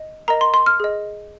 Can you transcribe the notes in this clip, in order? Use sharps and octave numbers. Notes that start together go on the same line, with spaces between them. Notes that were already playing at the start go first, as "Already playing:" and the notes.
Already playing: D#5
A#4 D#5 A#5
C6
C6
F6
G#4 D#5